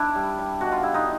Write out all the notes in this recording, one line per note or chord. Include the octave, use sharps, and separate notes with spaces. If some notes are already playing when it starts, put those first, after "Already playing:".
Already playing: D4 E4
G3
G3
B2 F#4
F4
G3 E4
D#4 F4